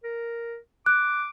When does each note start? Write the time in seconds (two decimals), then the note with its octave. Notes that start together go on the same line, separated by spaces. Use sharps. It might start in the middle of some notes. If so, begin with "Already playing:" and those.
0.03 A#4
0.86 D6 F#6